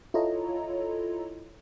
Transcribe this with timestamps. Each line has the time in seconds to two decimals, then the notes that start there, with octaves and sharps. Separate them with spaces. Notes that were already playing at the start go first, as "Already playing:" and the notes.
0.14 E4 F4 A4 C#5 D#5 A#5